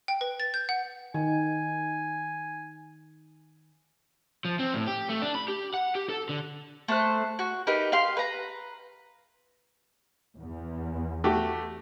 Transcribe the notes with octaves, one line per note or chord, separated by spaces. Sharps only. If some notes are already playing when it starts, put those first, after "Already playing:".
G5
B4
A6
G6
F#5
D#3 G#5
F3
C4
A2
G4
A3
D4
B5
G4
F#5
G4
A4
D3
A3 C5 F#6
F#4
D#4 G4 A#4 B4
G4 F5 C6
B4 A#5
E2
A3 F#4 G4